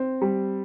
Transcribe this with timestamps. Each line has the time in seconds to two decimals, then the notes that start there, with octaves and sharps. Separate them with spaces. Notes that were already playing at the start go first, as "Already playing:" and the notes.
Already playing: C4
0.21 G3